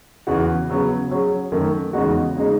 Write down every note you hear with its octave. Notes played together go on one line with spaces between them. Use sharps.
E2 C#3 E3 B3 F#4
C#3 F#3 B3
F#3 C#4 G#4
F#2 D#3 A3
E2 C#3 G#3 D#4 F#4
C#3 G#3 D#4